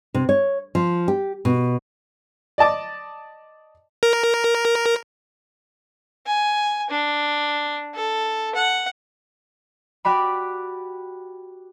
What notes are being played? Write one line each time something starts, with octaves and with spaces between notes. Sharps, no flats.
C3
C#5
F3
G4
B2
D5 D#5 A5 D6
A#4
G#5
D4
A4
F#5
F#4 G4 D5 B5